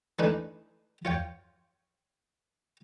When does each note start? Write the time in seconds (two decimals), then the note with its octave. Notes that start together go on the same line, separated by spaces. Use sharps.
0.19 E3 A3 D4 D#4 B4
1.05 F4 C#5 G5